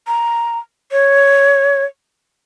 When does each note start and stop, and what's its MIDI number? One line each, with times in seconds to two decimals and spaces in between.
0.07 0.58 82
0.92 1.85 73